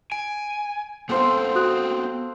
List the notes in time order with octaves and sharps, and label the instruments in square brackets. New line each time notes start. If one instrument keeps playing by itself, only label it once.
[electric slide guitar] G#5 [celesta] D7
[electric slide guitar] B3 C4 [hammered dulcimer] A4 C5 F5
[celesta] F#4 D#6 F#6